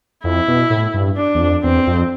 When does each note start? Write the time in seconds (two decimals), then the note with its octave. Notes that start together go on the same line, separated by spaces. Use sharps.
0.24 F2 E4
0.48 B2
0.70 A2
0.94 G2
1.17 D4
1.35 E2
1.40 F2
1.63 E2 C4
1.87 F2